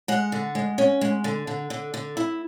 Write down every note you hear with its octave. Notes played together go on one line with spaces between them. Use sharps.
G#3 F#5
D3
G#3
C#4
G#3
D3
D3
D3
D3
E4